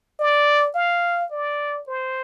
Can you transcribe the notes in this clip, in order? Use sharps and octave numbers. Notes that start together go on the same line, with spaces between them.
D5
F5
D5
C5